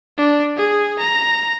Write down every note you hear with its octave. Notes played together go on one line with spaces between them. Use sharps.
D4
G#4
A#5